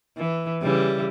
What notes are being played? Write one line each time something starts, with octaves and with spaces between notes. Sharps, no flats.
E3
C#3 E3 G3